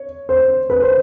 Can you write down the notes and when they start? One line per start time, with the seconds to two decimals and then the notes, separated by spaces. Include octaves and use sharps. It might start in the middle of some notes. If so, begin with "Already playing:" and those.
Already playing: C#5
0.29 C5
0.70 B4
0.82 C5